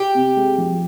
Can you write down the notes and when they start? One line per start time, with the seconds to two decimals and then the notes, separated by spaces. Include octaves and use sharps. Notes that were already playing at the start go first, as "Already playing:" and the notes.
Already playing: G4
0.15 C3
0.36 G#3
0.58 F3